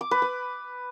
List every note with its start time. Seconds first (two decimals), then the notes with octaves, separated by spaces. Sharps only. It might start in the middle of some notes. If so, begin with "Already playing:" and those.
0.01 D6
0.11 B4
0.22 B4